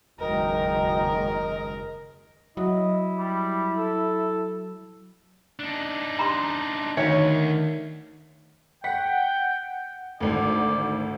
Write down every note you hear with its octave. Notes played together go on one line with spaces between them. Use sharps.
F#1 D#2 G#3 F#4 A#4 D#5 G5 A#5
F#3 E4 D#5
G3
A4
D4 D#4
A#5 C6
D2 D#3 C#5
F#5 G5 B6
G#1 D2 D5